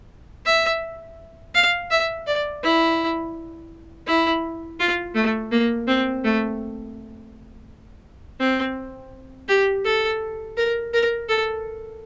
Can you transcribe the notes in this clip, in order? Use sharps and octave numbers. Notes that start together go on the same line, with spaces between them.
E5
F5
E5
D5
E4
E4
F4
A3
A#3
C4
A3
C4
G4
A4
A#4
A#4
A4